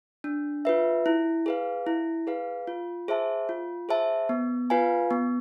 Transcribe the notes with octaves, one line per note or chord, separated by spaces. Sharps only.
D4
F4 B4 E5
E4
G#4 B4 F5
E4
G#4 B4 F5
F4
G#4 C5 E5 A5
F4
G#4 C5 E5 A5
B3
F4 B4 F5 G#5
B3